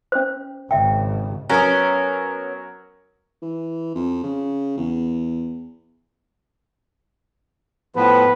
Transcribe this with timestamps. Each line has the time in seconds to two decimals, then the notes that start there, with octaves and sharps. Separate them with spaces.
0.12 C#4 C5
0.71 G#1 C#3 E5 G5
1.49 F#3 B3 C#4 A#4
3.42 E3
3.95 F2
4.24 C#3
4.77 E2
7.96 A2 F3 B3 B4